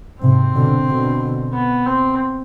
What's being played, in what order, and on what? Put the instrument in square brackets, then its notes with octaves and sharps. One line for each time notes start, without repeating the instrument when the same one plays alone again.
[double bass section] G#2 C3 [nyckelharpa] C4
[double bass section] B2 D3
B2 D3
[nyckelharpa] B3
C4